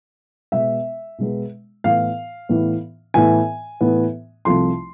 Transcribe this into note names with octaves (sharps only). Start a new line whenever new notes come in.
B2 G#3 B3 E5
B2 G#3 B3
A2 E3 B3 F5
A2 E3 B3
A2 E3 B3 G#5
A2 E3 B3
C2 C3 F3 A3 C6